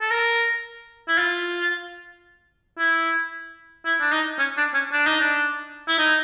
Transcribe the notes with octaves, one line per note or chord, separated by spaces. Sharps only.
A4
A#4
E4
F4
E4
E4
D4
D#4
C#4
D4
C#4
D4
D#4
D4
E4
D#4